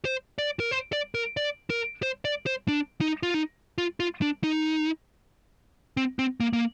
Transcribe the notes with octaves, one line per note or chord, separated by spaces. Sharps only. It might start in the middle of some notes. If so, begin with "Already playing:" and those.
C5
D5
A#4
C5
D5
A#4
D5
A#4
C5
D5
C5
D4
D#4
F4
D#4
F4
F4
D4
D#4
C4
C4
A#3
A#3